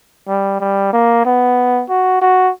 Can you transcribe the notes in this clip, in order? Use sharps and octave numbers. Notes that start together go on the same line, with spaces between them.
G3
G3
A#3
B3
F#4
F#4